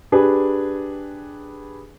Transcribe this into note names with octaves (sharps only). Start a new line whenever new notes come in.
D4 G4 G#4 B4